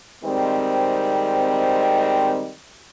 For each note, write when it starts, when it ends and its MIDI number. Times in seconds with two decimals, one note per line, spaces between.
0.24 2.50 51
0.24 2.50 55
0.24 2.50 56
0.24 2.50 60